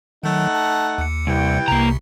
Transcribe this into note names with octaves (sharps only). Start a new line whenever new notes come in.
D#3 F#3 A3 D#4 F#5
A5
D#2 C#7
C2 E3 G4 G5
C2 C3 A#3 A#5